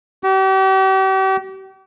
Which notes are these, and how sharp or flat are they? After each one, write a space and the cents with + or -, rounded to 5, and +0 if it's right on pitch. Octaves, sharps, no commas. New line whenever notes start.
G4 -40